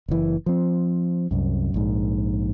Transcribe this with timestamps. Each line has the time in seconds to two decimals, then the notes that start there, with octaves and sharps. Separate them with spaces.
0.09 F#1 E3
0.46 F3 C4
1.31 C2 F#2
1.74 A#1 G#2